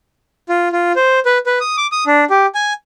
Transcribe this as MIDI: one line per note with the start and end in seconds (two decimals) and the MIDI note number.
0.49 0.69 65
0.73 0.92 65
0.96 1.19 72
1.26 1.38 71
1.46 1.59 71
1.61 1.76 87
1.77 1.87 86
1.92 2.04 87
2.07 2.24 62
2.30 2.46 67
2.55 2.73 80